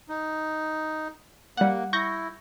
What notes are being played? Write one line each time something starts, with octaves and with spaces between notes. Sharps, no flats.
D#4
G3 A#3 F#5
E4 C#6 G6 A#6